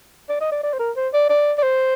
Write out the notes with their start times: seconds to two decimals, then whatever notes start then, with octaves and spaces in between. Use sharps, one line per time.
0.29 D5
0.41 D#5
0.52 D5
0.63 D5
0.73 C5
0.79 A#4
0.96 C5
1.13 D5
1.29 D5
1.58 D5
1.63 C5